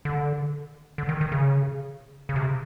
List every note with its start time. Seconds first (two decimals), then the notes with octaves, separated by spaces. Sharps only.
0.05 D3
0.98 D3
1.09 D#3
1.21 D#3
1.32 C#3
2.29 C#3
2.36 C3